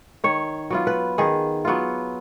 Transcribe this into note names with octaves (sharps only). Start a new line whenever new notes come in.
D#3 C#5
F#3 B3 F4
B4
D#3 G#4
F#3 B3 F4